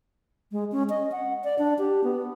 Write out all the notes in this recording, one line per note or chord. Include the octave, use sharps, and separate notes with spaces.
G#3
C#4
D#5
F#5
D5
D4
G4
B3